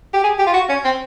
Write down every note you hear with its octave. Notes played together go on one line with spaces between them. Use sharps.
G4
G#4
G4
F4
F#4
C#4
C4